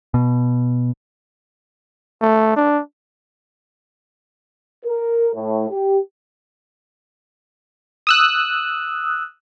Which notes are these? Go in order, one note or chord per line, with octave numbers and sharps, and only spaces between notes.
B2
A3
D4
A#4
A2
G4
D#6 E6 F#6